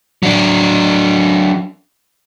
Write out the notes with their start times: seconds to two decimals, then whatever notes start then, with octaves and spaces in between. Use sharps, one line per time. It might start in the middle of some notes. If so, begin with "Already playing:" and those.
0.23 F#3 D4